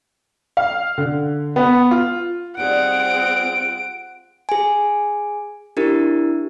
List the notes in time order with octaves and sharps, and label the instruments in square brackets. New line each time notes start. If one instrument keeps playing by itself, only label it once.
[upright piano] F5
D3
B3
F4
[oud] G3 D#4 [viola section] C4 F4 G#4 [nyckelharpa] F#5 [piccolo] D7
[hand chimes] G#4 G#5
D4 E4 G4 A#4